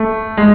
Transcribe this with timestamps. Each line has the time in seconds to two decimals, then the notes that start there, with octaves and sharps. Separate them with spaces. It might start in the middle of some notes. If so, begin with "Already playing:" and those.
Already playing: A3
0.37 G#3